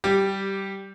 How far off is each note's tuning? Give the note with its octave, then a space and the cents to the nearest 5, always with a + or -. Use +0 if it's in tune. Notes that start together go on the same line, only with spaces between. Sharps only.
G3 -10 G4 +0